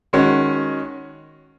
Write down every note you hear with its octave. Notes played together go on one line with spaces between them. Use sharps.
D#3 G#3 C#4 F#4